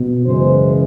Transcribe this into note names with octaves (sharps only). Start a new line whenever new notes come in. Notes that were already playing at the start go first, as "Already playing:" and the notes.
Already playing: B2
F#2 C#3 E3 G#3 C5